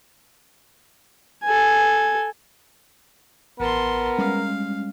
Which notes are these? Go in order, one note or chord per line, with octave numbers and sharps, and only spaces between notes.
A4 G#5
A1 B3 A#4 A5 C6
G3 G#3 C#4 F5